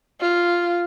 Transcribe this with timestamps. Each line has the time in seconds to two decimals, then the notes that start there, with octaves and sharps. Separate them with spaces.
0.20 F4